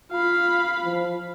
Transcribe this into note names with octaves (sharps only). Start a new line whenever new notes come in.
F4 F5 B5
F3